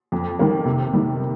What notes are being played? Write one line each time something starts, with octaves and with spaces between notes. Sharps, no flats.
F2
D#3 G3 A#3
C3
D#3 G3